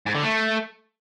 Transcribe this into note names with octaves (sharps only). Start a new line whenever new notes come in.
G#2
D3
A3